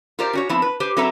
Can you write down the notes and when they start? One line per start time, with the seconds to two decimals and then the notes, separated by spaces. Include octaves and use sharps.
0.19 F4 G4 A#4 C5 D5
0.33 C#4 F#4 C#5
0.49 F3 B3 C4 E4
0.62 B4
0.80 G4 B4 C5
0.97 F#3 C4 A4 B4 E5 A#5